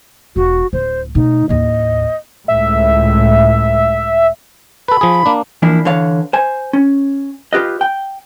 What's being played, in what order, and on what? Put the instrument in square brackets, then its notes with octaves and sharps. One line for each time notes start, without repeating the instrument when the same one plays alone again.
[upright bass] E1 [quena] F#4
[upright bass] D1 [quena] C5
[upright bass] B2 A3 [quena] D#4
[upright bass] A1 D#2 [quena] D#5
[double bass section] C#2 A2 [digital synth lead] E5
[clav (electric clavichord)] A4 B4 [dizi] B5
[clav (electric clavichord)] F3 G#4
A#3 D4
[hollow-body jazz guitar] E3 F3 A#3 D4 E4
D3 E3 C#5 F5
C5 G#5
C#4
F4 G4 B4 D#5
G5